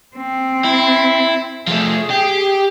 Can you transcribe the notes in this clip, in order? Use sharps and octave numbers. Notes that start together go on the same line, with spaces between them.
C4
E4
F3 A3 G#4
G4